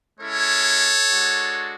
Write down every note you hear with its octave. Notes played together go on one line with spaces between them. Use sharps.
G#3 C#4 E4 A4 C#5
G#3 D4 F#4